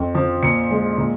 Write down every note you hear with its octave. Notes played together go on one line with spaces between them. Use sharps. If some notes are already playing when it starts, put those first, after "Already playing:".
Already playing: F2
F3
A#2 C#7
G#3
A#2